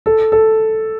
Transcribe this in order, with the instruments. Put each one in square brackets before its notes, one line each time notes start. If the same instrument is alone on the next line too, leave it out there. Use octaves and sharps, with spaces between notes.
[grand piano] A4
A4